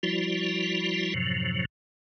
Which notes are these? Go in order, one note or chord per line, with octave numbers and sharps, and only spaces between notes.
F3 G3 E4 F#4
F#2 A2 C3 F3 F#3